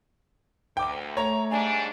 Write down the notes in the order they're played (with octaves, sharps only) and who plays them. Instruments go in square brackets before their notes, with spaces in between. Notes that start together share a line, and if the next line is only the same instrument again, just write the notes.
[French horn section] D2 [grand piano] G5 D6
[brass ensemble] A3 [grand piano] C#5 [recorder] A#5
[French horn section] G#2 G3 D4 [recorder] G#5